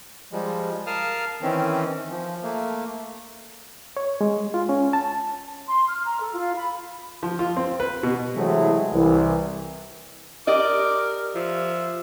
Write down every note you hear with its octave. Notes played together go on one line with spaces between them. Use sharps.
F3 G3 G#3
A#4 F5 A5 D#6 F6
D#3 E3 C4 C#4
F3
A3 A#3
C#5
G#3
F4
C#4
A5
C6
F6
A#5
A4
F4
B5
F3
F4
C4
B4
B2
C3 E3 F#3 G#3 A3 E4
C2 E3
G4 A#4 D5 D#5 D6
F3 E5